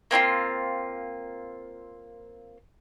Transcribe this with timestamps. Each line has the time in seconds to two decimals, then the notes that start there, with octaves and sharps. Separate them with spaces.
0.11 A#3 C4 E4 F4